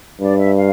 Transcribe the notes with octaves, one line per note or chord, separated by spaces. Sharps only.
G2 D5
E5
F5